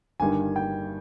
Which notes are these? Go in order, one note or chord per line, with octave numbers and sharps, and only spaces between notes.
G1 G2 D#3 G3 G#5
G5